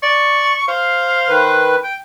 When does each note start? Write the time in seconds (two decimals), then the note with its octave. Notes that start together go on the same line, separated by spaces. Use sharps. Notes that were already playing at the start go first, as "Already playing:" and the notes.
0.03 D5 C#6
0.68 C5 F5
1.29 D#3 B4
1.83 G5